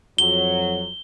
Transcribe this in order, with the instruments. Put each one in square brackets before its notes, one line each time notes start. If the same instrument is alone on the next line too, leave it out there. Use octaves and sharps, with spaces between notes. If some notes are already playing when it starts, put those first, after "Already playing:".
[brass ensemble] F2 F#3 [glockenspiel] G7